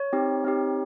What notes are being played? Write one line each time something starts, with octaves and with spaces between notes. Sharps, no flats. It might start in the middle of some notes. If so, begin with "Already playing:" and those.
Already playing: C#5
C4 D#4 G4
C4 D#4 G4